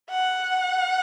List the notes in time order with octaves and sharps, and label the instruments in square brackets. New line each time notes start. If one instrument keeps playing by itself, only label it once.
[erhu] F#5